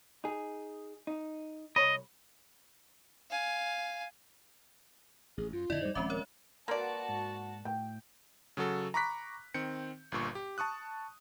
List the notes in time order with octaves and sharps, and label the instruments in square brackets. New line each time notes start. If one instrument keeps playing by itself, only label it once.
[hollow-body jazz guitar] D#4 G#4
D#4
[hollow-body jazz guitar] C2 C#5 B5 [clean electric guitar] D#5
[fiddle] F5 G#5
[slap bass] A1 [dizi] G#4
[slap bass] F#2 [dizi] F4
[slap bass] F2 A2 [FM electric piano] D3 E4 [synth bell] D5 D#5
[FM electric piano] G3 D#4 [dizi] C5
[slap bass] D#1 F3 C4 [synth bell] G#3 C#4 E5 [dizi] B5 [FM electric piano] D6
[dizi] A#4 [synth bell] C#5
[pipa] A#3 D5 [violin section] F#4 A5 [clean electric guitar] B4 G5 C6
[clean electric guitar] G#2
[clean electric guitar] A2 [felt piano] G5
[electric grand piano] C#3 F#3 F#4 A4
A#5 B5 C#6 D6 F#6 B6
D#3 C4 G6 C#7
G1 G2 A#2 C#6
G4
A5 C#6 D#6 F#6